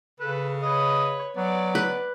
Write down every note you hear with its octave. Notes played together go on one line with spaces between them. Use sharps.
C#3 A4 B4
B4 C#5 D#5
F#3 B3 D5
B4